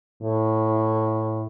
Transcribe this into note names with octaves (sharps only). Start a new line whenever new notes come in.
A2